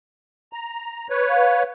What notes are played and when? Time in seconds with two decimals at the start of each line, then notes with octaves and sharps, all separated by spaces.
0.53 A#5
1.10 B4 C#5
1.30 F5